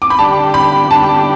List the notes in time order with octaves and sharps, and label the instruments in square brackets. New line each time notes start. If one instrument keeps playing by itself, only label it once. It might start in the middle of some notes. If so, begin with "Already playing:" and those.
[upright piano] D6
B5
[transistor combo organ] D3 G3 D4 G4 [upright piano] A5
[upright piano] B5
[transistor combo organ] D3 G3 D4 G4 [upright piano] A5